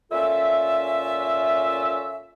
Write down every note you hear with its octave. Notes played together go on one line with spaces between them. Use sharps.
A#2 C#4 F4 A4 E5